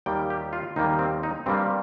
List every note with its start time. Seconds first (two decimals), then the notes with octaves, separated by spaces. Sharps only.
0.06 D#2 D#3 G3 A#3 G5
0.30 G4
0.53 F4
0.76 D#2 D#3 G3 A#3 D#4
0.99 C4
1.23 D#4
1.46 G2 G3 A#3 C4